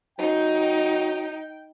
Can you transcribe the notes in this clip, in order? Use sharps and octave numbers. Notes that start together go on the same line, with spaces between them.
F#3 D#4 G5